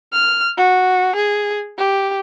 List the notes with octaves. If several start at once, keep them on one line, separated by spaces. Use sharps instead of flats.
F6
F#4
G#4
G4